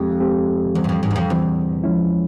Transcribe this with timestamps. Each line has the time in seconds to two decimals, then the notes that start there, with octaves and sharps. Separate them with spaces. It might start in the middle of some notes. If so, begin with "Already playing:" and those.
Already playing: F2 G#3 C4 G4
0.20 G#3 C4 G4
0.75 E2 E3 G3 C4
0.84 G2
0.89 F2
1.03 G#2
1.11 E2
1.16 F2
1.30 E2 E3 G3 C4
1.84 F3 G#3 C#4 E4